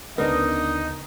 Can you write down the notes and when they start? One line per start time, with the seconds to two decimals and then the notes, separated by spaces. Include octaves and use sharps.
0.18 D2 C#3 B3 D4 D#4 A#4 D#5